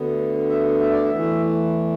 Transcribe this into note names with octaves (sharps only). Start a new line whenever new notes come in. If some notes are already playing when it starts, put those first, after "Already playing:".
Already playing: D2 D3 B3
E5
E5
D5
E5
E2 E3 A3